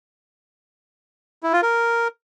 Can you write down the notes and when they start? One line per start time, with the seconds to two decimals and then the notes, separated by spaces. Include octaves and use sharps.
1.43 E4
1.53 F4
1.63 A#4